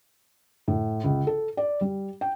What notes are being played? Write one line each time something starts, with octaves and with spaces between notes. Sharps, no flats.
A2
C#2
A4
D5
G3
G5